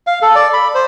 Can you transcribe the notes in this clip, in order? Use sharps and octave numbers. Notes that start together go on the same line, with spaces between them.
F5
A4
D5
B5
C5